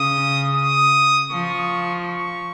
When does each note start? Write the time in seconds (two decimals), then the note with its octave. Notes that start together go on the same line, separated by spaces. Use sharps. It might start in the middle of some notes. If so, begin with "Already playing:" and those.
Already playing: C#3 D#6
0.54 D#6
1.31 F3 C#6
2.09 C#6